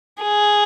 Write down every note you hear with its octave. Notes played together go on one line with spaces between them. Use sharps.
G#4